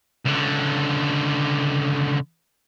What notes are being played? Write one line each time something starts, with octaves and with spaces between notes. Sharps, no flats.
C#2 D3